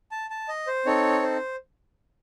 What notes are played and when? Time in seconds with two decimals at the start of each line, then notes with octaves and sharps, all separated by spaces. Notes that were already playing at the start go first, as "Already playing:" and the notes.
0.11 A5
0.30 A5
0.49 D#5
0.67 C5
0.85 C4 D#4 A4 C#5
1.23 C5